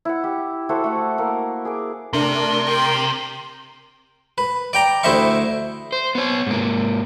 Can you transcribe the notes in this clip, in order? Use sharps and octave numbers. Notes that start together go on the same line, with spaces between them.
E4 F#5
G4
E4 F#4 A4 C5
A3 F#4 F#5
A#3 A#4
G#4 A#4 D6
C3 A3 D4 A#4
A#4 G5 C6
B4
D5 G5 A#5
D2 E4 C5 D#5 E5 C#6
C5
B3 C#5
G#2 A#3